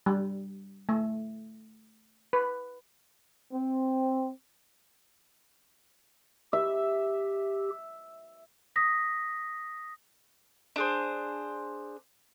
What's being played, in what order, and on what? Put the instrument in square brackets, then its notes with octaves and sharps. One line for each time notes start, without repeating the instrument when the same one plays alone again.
[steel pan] G3
A3
B4
[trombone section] C4
[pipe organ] G4 [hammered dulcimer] E5
[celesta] D#6 A#6 B6
[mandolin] D4 G#4 C5